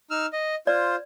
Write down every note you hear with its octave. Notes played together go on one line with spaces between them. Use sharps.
D#4 E6 F6
D#5
F4 C5 D5